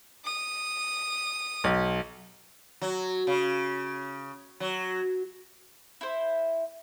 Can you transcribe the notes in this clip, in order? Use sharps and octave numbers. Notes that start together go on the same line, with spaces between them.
D#6
B1
F#3
C#3
F#3
E4 C5